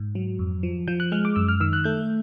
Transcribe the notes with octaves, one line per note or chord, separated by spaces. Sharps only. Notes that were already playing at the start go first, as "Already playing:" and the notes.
Already playing: G#2
F#3
F2
F3
F3 G6
F#6
G#3 F6
D6
F#2 E6
F6
D#3 E6
F#6
A3 G6